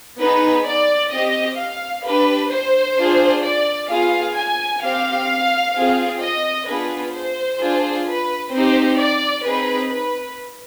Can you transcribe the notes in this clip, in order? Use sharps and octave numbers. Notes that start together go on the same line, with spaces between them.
B3 D#4 G#4 B4
D5
C4 G4 D#5
F5
D4 G4 B4
C5
D4 F4 G#4
D5
B3 F4 G#4 F5
G#5
C4 G4 F5
C4 F4 G#4
D#5
B3 D4 F4 G#4 B4
C5
D4 F4 G#4
B4
C4 D#4 G4 C5
D5
C4 D#4 G#4 B4
B4